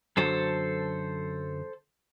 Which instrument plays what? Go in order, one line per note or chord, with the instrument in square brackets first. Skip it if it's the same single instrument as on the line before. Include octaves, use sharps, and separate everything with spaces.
[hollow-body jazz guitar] F#2 D3 F#3 [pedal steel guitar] A4 C5 A5